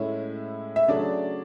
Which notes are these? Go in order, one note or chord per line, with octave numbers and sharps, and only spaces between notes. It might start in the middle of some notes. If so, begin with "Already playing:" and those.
Already playing: A2 G#3 C#4 E4
E5
C#3 F#3 A3 D4 D5